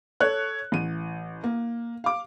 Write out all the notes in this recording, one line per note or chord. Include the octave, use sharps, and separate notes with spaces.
A4 C#5 F#6
A1 D#7
A#3
F5 D6